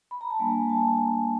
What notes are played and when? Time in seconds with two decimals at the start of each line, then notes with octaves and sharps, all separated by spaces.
0.11 B5
0.21 A#5
0.30 A5
0.39 G3 A#3 D4 G#5
0.69 A5
1.00 A#5